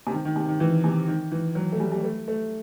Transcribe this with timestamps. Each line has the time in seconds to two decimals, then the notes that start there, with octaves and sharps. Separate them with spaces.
0.07 C3
0.13 D#3
0.25 D#3
0.36 C3
0.48 D#3
0.60 E3
0.84 C3
1.08 D#3
1.32 E3
1.55 F#3
1.72 A3
1.80 G3
1.92 G3
2.04 A3
2.28 A3